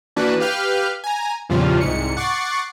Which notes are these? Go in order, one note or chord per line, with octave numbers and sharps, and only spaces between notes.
E3 A#3 D4 F#4 B4
G4 B4 F5 F6 G6
G#5 A#5
E2 A#2 C#3 F3 G3 F4
C2 G#2 C#7
F#5 C#6 D6 A6 C7